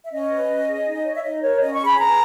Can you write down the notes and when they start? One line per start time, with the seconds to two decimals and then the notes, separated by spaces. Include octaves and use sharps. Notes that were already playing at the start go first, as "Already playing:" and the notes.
0.06 E5
0.11 C#4 D#5
0.30 B4
0.49 C#4
0.67 G#4
0.86 D#4
1.05 C#5
1.16 E5
1.24 D#4 D#5
1.42 A#4 C#5
1.61 C#4 D#5
1.74 C#6
1.80 G#4
1.86 B5
1.99 B4 A#5